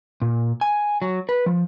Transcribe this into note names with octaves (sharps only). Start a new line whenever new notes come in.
A#2
G#5
F#3
B4
F3